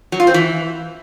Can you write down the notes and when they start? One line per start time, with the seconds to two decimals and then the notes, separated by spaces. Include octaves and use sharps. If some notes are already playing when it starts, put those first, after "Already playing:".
0.12 F#3
0.20 F4
0.27 C4
0.34 E3